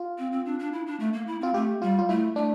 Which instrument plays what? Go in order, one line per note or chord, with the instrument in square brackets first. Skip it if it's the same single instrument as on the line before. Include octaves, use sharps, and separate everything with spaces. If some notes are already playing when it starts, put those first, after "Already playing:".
Already playing: [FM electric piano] F4
[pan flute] C4
C4
D4
D4
E4
D4
A3
A#3
E4
[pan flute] C4 [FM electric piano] F4
[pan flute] A3 [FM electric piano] G4
[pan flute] G3 [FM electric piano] F4
[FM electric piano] F4
[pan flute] A3 [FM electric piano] E4
[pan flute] A3 [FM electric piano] D4